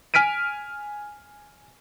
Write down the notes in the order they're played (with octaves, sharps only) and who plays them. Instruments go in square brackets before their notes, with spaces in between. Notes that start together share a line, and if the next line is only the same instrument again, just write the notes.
[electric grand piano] G#5 F6 B6 D7 D#7